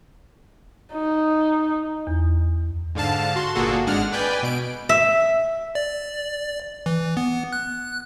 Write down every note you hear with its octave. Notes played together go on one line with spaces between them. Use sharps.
D#4
E2
G#2 D3 F5 A5
F#4 C6
G1 A#2 A#3 F#4 G#4 A4
G#1 G#3 D4 F#5 F6
B4 D5 G5 G#5
B2 D7
E5
D5
E3
B3
F#6